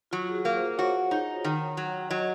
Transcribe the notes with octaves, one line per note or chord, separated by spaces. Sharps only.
F#3 F4
G#4
F#4
A#3
C5
F#4 C#5
D#4
D#3
F#3
F#3 D#5